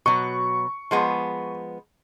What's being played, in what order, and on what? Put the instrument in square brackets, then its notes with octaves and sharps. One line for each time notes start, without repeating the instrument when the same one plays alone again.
[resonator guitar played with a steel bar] B2 F#3 [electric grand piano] C#6
[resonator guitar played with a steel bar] F3 G#3 B3